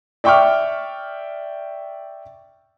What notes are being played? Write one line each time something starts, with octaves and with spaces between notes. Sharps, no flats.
D5 E5 G5 C#6 D6 F6